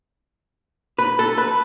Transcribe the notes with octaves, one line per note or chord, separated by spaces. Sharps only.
B4
A4
B4